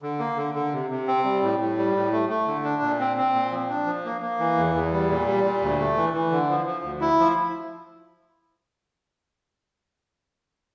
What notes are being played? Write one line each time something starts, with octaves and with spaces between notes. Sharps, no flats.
D3
A#3
D3
D3
C3
C3
C4
G3
A2
A2
G3
A2
A3
A3
D3
D4
A#2
C4
C4
A#2
F3
D4
F3
A#3
A#3
E3
E2
E2
G3
A#2
G3
A#2
D2
A3
E3
E3
D3
F3
F3
D2
E4
F3